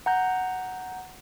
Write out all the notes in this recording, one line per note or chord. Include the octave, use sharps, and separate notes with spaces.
F#5 A#5 G6